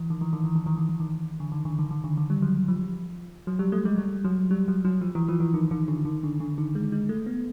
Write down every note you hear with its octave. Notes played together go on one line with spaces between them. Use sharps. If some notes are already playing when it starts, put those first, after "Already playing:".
Already playing: E3
D#3
E3
D#3
E3
D#3
E3
D#3
E3
D#3
D3
D#3
D3
D#3
D#3
D3
D#3
G3
F#3
F3
F#3
G3
A3
G#3
G3
F#3
G3
F#3
F#3
F3
E3
F3
E3
D#3
D#3
D3
D#3
D3
D3
D#3
G#3
G#3
A3
B3